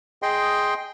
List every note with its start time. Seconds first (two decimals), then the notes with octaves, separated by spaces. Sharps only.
0.23 G#4 D#5 G5 C6